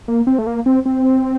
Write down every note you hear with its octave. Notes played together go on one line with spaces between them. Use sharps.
A#3
C4
A3
A#3
C4
C4